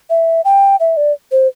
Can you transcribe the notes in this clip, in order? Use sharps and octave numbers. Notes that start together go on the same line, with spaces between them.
E5
G5
E5
D5
C5